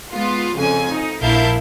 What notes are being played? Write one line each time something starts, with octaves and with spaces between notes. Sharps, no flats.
G#3 B3 F4
F2 C#3 G#5
D#4
A#1 E4 A#4 F5 A5 G6